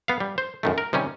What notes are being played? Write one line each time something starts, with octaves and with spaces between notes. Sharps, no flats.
B3 F5
G3
C5
F#2 D#3 A3
A#4
C3 D#3 G3 C#4